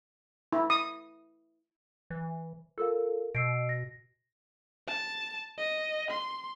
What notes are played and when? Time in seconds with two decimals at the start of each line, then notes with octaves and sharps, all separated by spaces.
0.52 E4
0.70 D#6
2.10 E3
2.78 F4 A4 A#4 F5
3.35 B2 E6 C7 D7
3.69 A#6
4.88 A5
5.58 D#5
6.11 C6